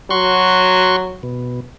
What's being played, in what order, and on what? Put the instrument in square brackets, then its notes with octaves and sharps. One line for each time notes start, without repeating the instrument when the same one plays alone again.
[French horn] F#3 [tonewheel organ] F#4 C6 C#6
[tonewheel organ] B2